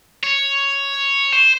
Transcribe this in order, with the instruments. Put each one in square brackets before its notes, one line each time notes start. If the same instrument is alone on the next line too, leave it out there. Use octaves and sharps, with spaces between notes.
[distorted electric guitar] C#5
C5